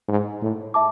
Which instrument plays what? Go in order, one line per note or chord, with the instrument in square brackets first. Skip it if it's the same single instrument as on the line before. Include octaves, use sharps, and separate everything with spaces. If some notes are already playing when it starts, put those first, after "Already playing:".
[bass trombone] G#2
A2
[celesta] E5 A5 D6